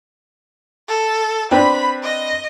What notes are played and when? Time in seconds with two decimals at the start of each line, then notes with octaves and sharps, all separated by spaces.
0.88 A4
1.51 C4 D4 B4 B5
2.03 D#5